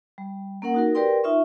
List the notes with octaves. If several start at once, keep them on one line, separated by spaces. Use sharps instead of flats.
G3
A#3 C#4 A#4 F#5
D#4 F#4 A#4
G4 A#4 B4 D5 G5 C6
D#4 F4 E5 C#6